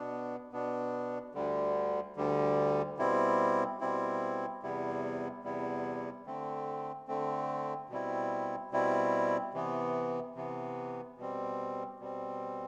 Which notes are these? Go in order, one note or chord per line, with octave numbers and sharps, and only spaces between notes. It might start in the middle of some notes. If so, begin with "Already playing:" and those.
Already playing: B2 B3 D4
B2 B3 D4
D2 D3 G3
D2 D3 G3
B2 G3 C4 E4
B2 G3 C4 E4
E2 C3 G3 B3 E4
E2 C3 G3 B3 E4
D3 A3 C4
D3 A3 C4
B2 G3 C4 E4
B2 G3 C4 E4
C3 E3 B3
C3 E3 B3
B2 G3 C4
B2 G3 C4